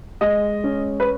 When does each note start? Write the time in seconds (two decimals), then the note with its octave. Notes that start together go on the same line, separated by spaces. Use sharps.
0.21 G#3 D#5
0.64 C#4
1.00 B4